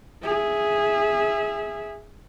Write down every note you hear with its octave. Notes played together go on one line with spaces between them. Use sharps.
G#4 E5